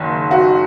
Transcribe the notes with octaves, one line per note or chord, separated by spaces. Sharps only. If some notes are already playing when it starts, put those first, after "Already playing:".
Already playing: F#1 F#2 D#3
F#4